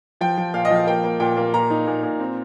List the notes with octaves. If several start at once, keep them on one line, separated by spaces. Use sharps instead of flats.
F3 G5
F3
A#2 F5
D#5
F3 F5
A#3 G5
A#3
A#2 G5
A#3
A#2 A#5
D#4
A#2
A#2
C4